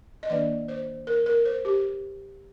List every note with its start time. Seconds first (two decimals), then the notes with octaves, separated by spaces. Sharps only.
0.23 D#5
0.30 D#3 A#3 D4 D5
0.68 C5
1.07 A#4
1.26 A#4
1.45 C5
1.65 G4